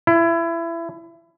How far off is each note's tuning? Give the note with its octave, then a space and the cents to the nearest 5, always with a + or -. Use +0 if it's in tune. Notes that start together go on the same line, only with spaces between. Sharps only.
E4 +25